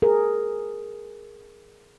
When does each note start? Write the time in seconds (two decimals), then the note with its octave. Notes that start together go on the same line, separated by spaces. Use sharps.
0.02 G#4 A#4